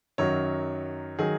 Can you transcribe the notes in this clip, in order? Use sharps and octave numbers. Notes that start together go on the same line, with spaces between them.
F#2 D#3 F#3 C#5
D#3 F#3 G#4